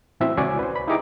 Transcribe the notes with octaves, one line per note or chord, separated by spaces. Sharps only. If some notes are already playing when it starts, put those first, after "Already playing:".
A2 E3 C4 E4 F#4 E5
C#2 C#4 F#4 D5 G#5
B4 C5
B5
D#4 E4 G4 G#4 A#5 D6